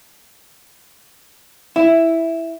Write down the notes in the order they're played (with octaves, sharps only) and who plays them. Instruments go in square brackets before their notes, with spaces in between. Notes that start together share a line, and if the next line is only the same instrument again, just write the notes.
[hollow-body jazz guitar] E4